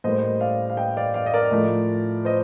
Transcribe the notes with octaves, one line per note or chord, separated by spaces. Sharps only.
A2 G3 A#3 C5 D#5
D5 F5
F5
D#5 G5
D5 F5
D5 F5
D#5
A#4 D5
A2 F3 A3
C5 D#5